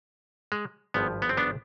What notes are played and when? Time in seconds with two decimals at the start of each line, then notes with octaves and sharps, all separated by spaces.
0.52 G#3
0.94 G#1 G2 F3 B3
1.22 B3
1.29 C4
1.37 B3 D4